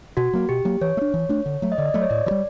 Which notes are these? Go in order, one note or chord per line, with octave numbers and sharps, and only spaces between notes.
B2 F#4
F#3 A#3
B2 G4
F#3 A#3
E3 C#5
A3
D4
E3
A3 D4
D3
F#3 A3
D#5
D3 D5
D#5
F#3 A3 D5
C#5
A2 D5
E3
G3